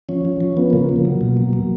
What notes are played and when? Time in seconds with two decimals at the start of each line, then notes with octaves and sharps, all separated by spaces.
0.09 F3 C#4
0.25 F3
0.41 F3
0.57 F3 B3
0.70 C#3 A#3
0.89 F3
0.96 A#3
1.05 F#3
1.21 B2
1.37 F#3
1.53 F#3